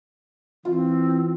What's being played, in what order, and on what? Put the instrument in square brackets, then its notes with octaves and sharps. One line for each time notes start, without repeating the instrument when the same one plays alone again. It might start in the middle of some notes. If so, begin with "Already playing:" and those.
[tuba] E3 [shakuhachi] C4 [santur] F4